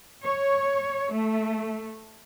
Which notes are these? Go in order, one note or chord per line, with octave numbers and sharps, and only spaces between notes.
C#5
A3